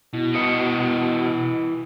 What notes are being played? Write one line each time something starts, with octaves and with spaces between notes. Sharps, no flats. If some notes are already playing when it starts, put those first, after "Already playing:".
B2 E4
E4 B4 D#5 D#6 C#7